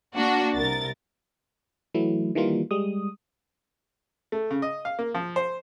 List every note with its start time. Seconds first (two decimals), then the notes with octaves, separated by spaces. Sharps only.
0.15 A#3 D4 F#4
0.56 C2 A#4 A6
1.94 E3 F#3 A3 E4
2.35 D#3 E3 G3 A#3 F4
2.71 G3 G#3 D#6
4.32 A3
4.51 C#3
4.62 D#5
4.85 F5
4.99 A#3
5.15 F3
5.36 C5